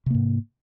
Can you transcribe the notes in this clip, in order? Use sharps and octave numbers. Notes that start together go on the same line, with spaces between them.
G#2 C3 A#3